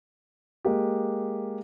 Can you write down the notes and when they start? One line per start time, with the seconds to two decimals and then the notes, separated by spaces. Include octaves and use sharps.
0.65 G#3 A#3 G4